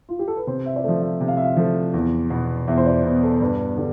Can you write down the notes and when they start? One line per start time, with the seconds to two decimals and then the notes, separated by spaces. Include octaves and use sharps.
0.09 F4
0.19 G4
0.28 A4
0.37 B4
0.47 C3 C5
0.66 E5
0.76 D5
0.84 F3 A3 E5
1.02 E5
1.21 C3
1.28 F5
1.37 E5
1.44 F5
1.57 F3 A3
1.94 E2
2.30 B2 B3
2.68 E2 E5
2.78 C5
2.86 D5
3.04 B2 B3
3.23 A4
3.41 G2 B4
3.77 D3 G3